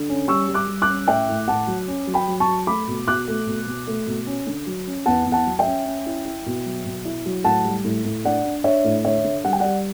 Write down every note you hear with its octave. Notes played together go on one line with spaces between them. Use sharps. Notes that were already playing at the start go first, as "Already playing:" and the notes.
Already playing: D3
C#4
G3 C#6 E6
G3
D6 F#6
G3
D6 F#6
C#4
A2 E5 G5
A2
A2 F#5 A5
F#3
C#4
F#3
G5 B5
F#3
A5 C#6
F#3
A3 B5 D6
B2
B2 D6 F#6
A3
B2
B2
A3
B2
C#4
D3
F#3
C#4
E2 F#5 A5
E2
F#5 A5
F#3
E5 G5
C#4
C#4
E4
E4
B2
F#3
B2
E4
F#3
A2 F#5 A5
G3
A2
A2
D4 D5 F#5
D4
D4 C#5 E5
A2
D3 C#5 E5
D3
G3 F#5
G5
G3 D5 F#5